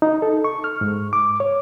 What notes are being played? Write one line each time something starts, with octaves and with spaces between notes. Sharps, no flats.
D#4
A4
C#6
F6
G#2
D6
C#5